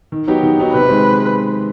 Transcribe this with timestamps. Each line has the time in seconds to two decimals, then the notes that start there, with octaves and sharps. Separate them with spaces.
0.12 D#3
0.27 F#3 B3 D#4 G4
0.43 D#3
0.58 F#3 B3 D#4 G4
0.73 C3 B4
0.89 D#3 G#3 C4